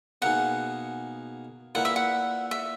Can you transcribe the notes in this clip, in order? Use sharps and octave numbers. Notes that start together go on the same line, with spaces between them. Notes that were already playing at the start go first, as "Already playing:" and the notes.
B2 A#3 D#4 G#4 F#5
A#2 A#3 E4 B4 F#5
E5
F#5
E5